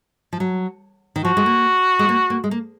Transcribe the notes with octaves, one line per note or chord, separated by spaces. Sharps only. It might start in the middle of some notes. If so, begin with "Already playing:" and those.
F3
F#3
D#3
F3 F#4
G#3
A#3
G#3
A#3
A#3
G#3
A#3